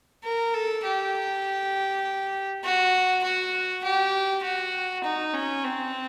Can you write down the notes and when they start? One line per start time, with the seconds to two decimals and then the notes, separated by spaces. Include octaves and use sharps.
0.24 A#4
0.54 A4
0.84 G4
2.64 F#4
3.24 F#4
3.84 G4
4.43 F#4
5.03 D#4
5.34 C#4
5.63 C4